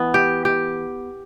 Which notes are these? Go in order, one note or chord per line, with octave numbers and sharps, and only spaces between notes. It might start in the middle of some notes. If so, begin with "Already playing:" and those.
Already playing: E3 B3
G4
G4